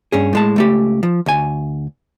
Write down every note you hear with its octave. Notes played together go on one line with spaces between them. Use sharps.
G2 C#4 G#4
A2 G#3 A5
C#2 A3 G4
F3
D2 G#5